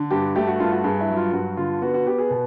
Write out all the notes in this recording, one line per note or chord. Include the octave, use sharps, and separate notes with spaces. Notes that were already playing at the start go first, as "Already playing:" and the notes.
Already playing: D3
G2 G4
A3 G4
F#4
G2 F4
F#4
G2 G#4
E4
F#3
F4
G2 F#4
D3 F4
B3 F#4
F#4
B3 G4
G#4
B2